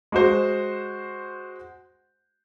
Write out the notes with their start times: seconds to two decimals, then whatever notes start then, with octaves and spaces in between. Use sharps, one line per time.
0.12 G#3 F#4 C5